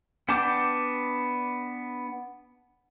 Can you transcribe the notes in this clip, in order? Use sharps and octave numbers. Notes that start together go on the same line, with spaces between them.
B3 D4 G5 A5 D6